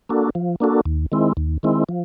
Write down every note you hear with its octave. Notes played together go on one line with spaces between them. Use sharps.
A#3 D4 F#4 A4
F3
A#3 D4 F#4 A4
D#2
D#3 G#3 C4 E4
D#2
D#3 G#3 C4 E4
F3